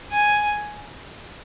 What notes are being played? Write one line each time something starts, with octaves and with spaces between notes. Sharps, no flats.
G#5